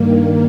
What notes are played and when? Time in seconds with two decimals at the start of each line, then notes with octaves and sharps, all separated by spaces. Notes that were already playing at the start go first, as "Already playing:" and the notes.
Already playing: G2 D#3 A#3